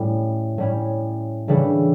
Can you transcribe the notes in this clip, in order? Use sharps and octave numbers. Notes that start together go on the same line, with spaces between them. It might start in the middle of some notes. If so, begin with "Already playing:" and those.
Already playing: A2 G3 C#4
A2 G3 C#4
C#3 E3 G3 D4 A4